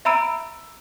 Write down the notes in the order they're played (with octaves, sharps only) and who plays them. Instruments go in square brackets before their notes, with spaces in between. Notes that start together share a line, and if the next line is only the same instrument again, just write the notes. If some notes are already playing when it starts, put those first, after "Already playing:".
[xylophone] E5 A#5 B5 E6 D7